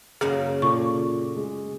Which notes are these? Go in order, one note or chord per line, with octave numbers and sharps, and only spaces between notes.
F#2 C#3 A#3 G#4
A#2 A4 C#6 D6
G#3